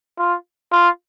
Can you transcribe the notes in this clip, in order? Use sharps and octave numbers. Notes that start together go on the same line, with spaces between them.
F4
F4